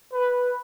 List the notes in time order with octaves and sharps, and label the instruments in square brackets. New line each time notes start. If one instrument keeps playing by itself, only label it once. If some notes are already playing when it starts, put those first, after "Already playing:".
[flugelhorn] B4